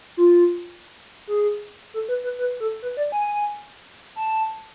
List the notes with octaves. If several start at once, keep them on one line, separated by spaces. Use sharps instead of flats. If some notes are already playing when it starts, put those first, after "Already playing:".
F4
G#4
A4
B4
B4
B4
A4
B4
D5
G#5
A5